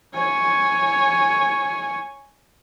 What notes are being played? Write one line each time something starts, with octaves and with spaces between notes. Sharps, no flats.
C#5 G#5